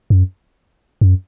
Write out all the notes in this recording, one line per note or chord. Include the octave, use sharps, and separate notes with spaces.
F#2
F#2